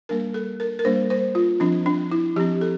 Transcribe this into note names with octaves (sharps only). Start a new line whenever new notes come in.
G3 A#3 D4 A#4
A4
A#4
A#4
G3 A#3 D4 C5
C5
F4
F3 C4 D4
D4
E4
F3 C4 G4
A4